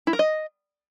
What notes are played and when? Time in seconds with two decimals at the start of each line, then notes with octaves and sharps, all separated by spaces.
0.07 E4
0.13 A#4
0.19 D#5